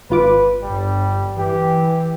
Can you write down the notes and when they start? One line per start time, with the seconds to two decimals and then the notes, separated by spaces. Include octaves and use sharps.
0.10 G#1 F4 B4 D6
0.63 G1 G3
1.37 E3 G4